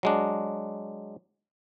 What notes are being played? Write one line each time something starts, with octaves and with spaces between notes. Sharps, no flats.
F#3 G#3 D4